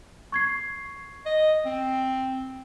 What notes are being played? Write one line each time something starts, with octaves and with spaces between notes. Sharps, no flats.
C#6 G#6 C7
D#5
C4